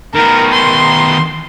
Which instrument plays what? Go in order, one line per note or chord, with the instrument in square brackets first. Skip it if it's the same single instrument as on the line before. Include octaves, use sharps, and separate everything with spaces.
[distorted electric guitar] D#3 B3 [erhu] A#4
[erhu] C6